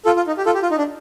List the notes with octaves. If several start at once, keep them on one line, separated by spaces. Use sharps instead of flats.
F4 A4
F4
D#4
G4
F4 A4
G4
F4
D#4
D4